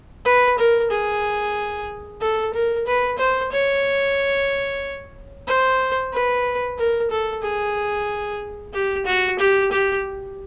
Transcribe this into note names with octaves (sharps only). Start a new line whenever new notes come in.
B4
A#4
G#4
A4
A#4
B4
C5
C#5
C5
B4
A#4
A4
G#4
G4
F#4
G4
G4